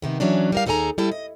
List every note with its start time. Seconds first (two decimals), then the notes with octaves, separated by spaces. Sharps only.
0.02 C3 D#3 B3
0.20 E3 F#3 C#4 D4
0.52 G3 A#4 F5
0.66 D#2 D#4 G#4 A4 G#5 A#5
0.98 G3 E4 A4 D5
1.11 D#5